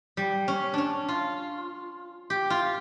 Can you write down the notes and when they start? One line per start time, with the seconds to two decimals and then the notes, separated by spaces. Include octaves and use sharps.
0.17 G3
0.48 C#4
0.74 C#4 D4
1.08 F4
2.30 G4
2.50 F4